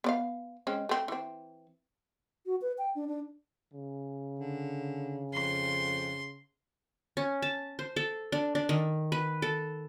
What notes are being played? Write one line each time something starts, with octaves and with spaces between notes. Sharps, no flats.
B3 D5 F5
G#3 C4 C#4
A3 C4
E3 C4
F#4
B4
G5
D4
D4
C#3
D3
F2 C6
C#4
A5
C5
A4
D4
D4
D#3
B4
A4